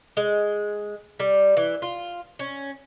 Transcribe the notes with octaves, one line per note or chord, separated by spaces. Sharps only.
G#3
G3
E3
F4
C#4